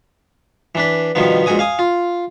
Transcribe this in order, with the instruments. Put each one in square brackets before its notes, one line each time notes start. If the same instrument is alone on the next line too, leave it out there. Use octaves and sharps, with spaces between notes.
[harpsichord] E3 D4 B4
G2 B2 D#3 F3 B3
A#1 G#2 F#4 G#5 D#6
F5 G#5 D#6
F4